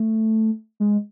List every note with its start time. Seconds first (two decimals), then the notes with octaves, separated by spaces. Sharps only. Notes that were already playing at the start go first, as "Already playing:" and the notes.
Already playing: A3
0.80 G#3